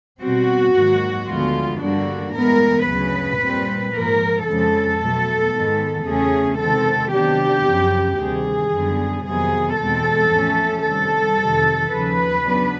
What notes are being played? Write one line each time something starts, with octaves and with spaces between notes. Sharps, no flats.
B2 G3 C4 F#4
G#2 D#3 F#3 A#3
D2 D3 F3 G#3 B3 F4
G2 D3 G3 A#3 D4 F#4
A2 E3 G#3 B3 A#4
D2 C#3 F#3 B4
A#2 G3 C4
G#2 F3 A#3 A#4
F2 C#3 F3 G#3 A4
B2 F#3 A3
G#2 D#3 G#3 B3
E2 C#3 E3 A3 C#4 G#4
C3 D#3 G#3 C4 A4
C3 D#3 F#3 B3 D4 G4
F#2 C#3 F3
D2 C3 D#3 G3 G#4
F#2 D3 G3 B3
F2 C3 D#3 F#3 B3 G#4
E2 B2 G#3 C4 A4
A2 F3 A3 C#4
C3 D#3 G3 A4
F2 C3 D#3
D#2 C#3 F3 B4
C#3 F#3 B3 D4